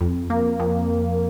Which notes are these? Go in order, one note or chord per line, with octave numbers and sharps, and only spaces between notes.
F2
A#3
F2